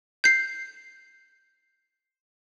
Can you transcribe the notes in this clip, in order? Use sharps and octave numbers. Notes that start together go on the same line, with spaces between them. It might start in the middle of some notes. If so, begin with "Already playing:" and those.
G6 C7